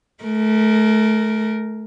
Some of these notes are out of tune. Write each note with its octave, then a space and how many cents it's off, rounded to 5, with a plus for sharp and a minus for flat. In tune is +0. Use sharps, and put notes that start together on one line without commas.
A3 -30 A#4 +0